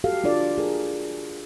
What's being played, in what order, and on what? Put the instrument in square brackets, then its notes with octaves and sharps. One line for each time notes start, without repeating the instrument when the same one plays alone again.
[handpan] F#4 G4 A4 F5
D4 F4 A4 D5
G#4 A#4